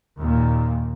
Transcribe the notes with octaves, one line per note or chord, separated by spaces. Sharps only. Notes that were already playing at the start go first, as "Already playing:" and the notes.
D#2 A#2